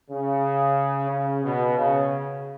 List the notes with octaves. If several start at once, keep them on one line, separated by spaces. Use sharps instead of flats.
C#3
C#3
B2
C#3